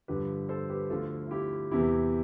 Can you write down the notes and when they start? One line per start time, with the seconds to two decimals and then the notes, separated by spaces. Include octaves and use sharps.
0.08 G2 D3 F3 G4 B4
0.49 A4 C5
0.69 G4 B4
0.90 D2 D3 F3 F4 A4
1.26 F4
1.31 E4 G4
1.71 E2 C3 E3 E4 G4